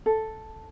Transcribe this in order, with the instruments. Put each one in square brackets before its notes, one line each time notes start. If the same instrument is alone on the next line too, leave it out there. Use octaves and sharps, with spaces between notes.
[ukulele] A4